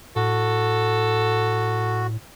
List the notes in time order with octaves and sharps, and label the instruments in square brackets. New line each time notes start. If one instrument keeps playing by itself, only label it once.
[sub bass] A2 [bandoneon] F#4 [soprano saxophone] A4